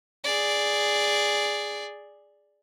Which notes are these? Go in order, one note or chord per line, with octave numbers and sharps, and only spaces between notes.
G#4 D5